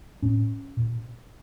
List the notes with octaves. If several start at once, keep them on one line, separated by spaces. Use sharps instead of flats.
A2 C#4
A#2